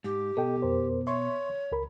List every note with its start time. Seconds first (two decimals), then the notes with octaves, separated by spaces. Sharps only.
0.04 G#2 G4
0.37 B2 A4 D#5 G5
0.62 F2 A#4 C5
1.07 C#5 E5 C6 C#6
1.72 C#2 A#4 B5